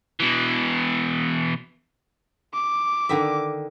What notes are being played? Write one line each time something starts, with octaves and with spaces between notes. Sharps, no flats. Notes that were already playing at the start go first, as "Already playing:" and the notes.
B2 E3
D6
D3 D#3 E5